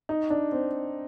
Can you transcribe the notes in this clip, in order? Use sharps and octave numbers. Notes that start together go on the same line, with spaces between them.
D#4
D4
C4